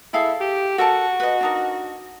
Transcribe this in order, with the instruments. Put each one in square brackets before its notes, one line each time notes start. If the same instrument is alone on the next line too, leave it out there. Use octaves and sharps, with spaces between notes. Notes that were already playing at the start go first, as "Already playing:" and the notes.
[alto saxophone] E4 [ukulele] G#4 A4 F5
[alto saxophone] G4
[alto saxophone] F#4 [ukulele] A4 A#4 A5
[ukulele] B4 D#5
D4 D#4 A#4